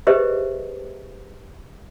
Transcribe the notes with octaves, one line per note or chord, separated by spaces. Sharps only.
G4 G#4 B4 C5 D#5 E5